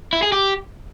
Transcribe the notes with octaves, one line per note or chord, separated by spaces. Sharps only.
E4
G#4
G4